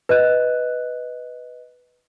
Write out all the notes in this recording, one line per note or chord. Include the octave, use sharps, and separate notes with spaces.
B4 D#5 F#6